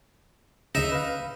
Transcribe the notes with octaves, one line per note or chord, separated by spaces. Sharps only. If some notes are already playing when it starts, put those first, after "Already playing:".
D2 C#3 D#4 E5
B4 F5